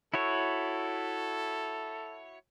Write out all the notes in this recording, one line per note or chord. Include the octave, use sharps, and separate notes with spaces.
E4 F#4 A4 C#5